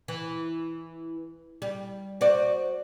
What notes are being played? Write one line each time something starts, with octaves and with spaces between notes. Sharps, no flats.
E3
G3
F#4 C5 D5